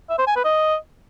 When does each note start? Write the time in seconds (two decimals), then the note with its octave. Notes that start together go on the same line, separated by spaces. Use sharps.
0.10 E5
0.18 C5
0.27 G#5
0.36 B4
0.45 D#5